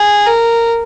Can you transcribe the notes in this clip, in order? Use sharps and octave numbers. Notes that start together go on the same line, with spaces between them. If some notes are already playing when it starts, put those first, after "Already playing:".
Already playing: G#4
A#4